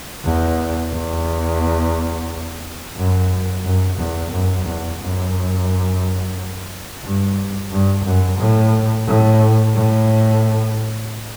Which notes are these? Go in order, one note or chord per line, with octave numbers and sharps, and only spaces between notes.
E2
E2
F#2
F#2
E2
F#2
E2
F#2
G2
G2
F#2
A2
A2
A2